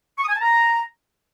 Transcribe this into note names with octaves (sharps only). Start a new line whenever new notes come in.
C#6
D#6
G#5
A5
A#5